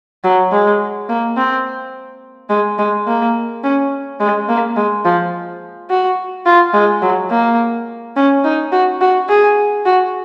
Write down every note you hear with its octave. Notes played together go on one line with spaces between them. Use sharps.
F#3
G#3
A#3
C4
G#3
G#3
A#3
C#4
G#3
A#3
G#3
F3
F#4
F4
G#3
F#3
A#3
C#4
D#4
F#4
F#4
G#4
F#4